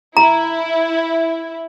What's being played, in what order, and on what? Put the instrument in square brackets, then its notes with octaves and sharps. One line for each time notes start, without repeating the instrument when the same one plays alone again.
[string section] E4 [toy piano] A#5